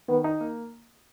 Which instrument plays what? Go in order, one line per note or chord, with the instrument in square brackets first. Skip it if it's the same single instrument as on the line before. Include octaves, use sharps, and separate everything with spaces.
[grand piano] D#3 [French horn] B3
[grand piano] D#4
A#3